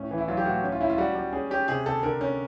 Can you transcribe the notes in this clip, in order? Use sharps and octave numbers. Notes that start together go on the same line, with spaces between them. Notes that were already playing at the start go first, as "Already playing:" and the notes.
Already playing: A2 C#4
E3
E4
F#3 F4
G4
A2 F#4
C#4
F4
C#4 E4
F4
G3 F#4
G3
C#4 G#4
C#4 G4
C3 G#4
C3 A4
D3 A#4
C#4